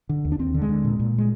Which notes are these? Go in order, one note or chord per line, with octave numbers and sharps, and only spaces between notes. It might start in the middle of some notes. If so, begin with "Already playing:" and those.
D3
D#2
D4
D#2 C4
D3
G#3
D3
A#2
A#2
G#3